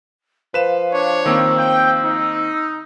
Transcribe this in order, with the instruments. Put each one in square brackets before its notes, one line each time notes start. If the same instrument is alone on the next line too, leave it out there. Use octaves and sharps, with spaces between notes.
[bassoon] F3 [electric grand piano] B4 E7 [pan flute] F5
[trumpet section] D4 C#5
[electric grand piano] D#3 A#3 C4 [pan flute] E6
[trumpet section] G5
D#4